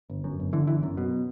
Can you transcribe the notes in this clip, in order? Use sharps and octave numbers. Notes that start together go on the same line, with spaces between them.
G1
F#2
G1
D3 E3
G1 E3
F#2
B2